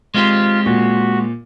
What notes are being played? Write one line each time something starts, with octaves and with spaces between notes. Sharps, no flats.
G#3 C4 F4 G4
A#2 F#4